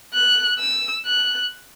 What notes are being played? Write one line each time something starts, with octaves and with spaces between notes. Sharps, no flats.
F#6
E6
F#6